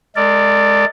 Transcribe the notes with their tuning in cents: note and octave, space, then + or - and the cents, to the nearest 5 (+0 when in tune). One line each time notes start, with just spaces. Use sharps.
G#3 +10 A#4 -45 D5 +0